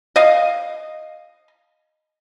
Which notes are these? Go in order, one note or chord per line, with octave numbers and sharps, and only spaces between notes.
D#5 F5